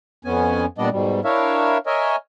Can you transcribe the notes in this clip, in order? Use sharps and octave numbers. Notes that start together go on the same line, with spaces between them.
F2 B3 C#4 G#5
A#2 G3 B3 D4 D5 D#5
G#2 B2 G3
D4 E4 A#4 C#5 E5 F5
A#4 C#5 D#5 E5 G#5